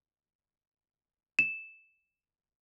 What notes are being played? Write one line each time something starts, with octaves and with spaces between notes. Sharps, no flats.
E7